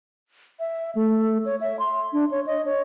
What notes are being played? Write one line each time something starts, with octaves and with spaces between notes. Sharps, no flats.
E5
A3
C#5
E5
C6
D4
C#5
D#5
C#5